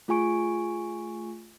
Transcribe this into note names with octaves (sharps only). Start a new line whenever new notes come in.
A3 F4 G#4 G#5 C#6 D7